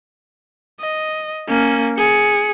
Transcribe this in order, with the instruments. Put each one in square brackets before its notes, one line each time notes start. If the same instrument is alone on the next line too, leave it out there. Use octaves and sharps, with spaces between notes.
[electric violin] D#5
A#3 C#4
G#4 C#7